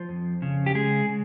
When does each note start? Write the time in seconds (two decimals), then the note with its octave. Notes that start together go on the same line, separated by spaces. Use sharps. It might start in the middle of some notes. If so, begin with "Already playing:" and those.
Already playing: F3 C5
0.09 F2
0.42 C#3
0.66 G4
0.75 G#3 G#4
1.09 C#3